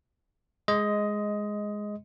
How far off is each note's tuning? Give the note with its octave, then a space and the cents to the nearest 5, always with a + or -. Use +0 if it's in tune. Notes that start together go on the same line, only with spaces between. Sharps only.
G#3 +0 D#5 +10 C6 -20